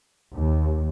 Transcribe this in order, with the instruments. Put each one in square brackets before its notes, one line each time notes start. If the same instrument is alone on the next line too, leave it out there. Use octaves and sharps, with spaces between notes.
[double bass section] D#2